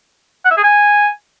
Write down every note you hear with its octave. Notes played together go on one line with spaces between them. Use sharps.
F#5
E5
G#4
G#5